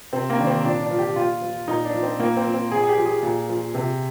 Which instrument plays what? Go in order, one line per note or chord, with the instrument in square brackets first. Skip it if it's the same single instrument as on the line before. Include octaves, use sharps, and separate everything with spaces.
[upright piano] C3 C4
A#3
D#3 D4
C4
A#2 D4
D4
F3
G4
A#2 F4
F3
A#2 D#4
D4
F3
C4
A#2 A#3
C4
F3
C4
A#2 G#4
G#4
G4
F3
G#4
A#2
F3
C3